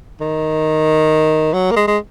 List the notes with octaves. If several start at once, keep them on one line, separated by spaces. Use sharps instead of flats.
D#3
F#3
A#3
G#3
G#3